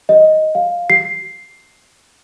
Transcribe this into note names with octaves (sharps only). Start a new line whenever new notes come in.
D#5
F5
C7